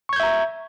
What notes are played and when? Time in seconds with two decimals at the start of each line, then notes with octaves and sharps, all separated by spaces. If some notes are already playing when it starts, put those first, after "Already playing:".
0.09 C#6
0.13 G#6
0.16 G6
0.20 E5
0.23 A#5